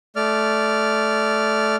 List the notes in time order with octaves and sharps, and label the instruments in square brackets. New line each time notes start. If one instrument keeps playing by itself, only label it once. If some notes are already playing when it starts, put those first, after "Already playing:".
[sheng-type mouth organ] A3 D5 F6